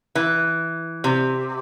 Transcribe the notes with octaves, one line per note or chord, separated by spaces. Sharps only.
E3
C3